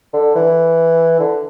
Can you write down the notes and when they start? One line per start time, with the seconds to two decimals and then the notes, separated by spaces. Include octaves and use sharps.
0.13 D3
0.36 E3
1.20 D3